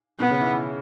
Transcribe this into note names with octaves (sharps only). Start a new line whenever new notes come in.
B2 B3
C#3
E3
E3